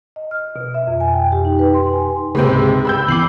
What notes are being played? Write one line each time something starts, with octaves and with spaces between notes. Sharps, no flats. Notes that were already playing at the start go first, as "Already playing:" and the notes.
D#5
F6
B2
E5
F2
G#5
G5
G4
D#4
B4
C6
G#5
C#2 G#2 C3 B4 G5
B5 E6 G6
E2 D6 C7 F#7